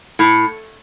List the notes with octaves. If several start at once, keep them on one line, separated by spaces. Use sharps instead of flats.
A2